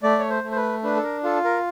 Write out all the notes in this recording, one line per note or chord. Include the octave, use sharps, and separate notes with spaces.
A3 D5
C#5
C5
A3
C5
B4
D4 B4
A4
A#4
F4 A4
A#4